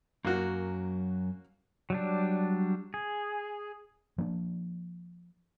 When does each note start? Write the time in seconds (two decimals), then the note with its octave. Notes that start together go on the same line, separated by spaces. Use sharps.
0.25 F#2 F#3 A#3 F#4
1.90 F#3 G3 D4
2.94 G#4
4.18 F3 A#3 C#4 D4